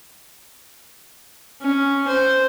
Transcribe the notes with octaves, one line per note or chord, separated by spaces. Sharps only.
C#4
C5